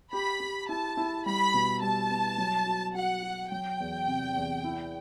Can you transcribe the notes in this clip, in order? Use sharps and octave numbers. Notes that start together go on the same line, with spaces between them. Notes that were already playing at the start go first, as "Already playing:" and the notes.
G4 B5
G4
E4 A5
E4
G3 B5
B2
G3 A5
B3
F#3
F#4
F#4 F#5
F#4
F#3 G5
E2
C3
E2
E4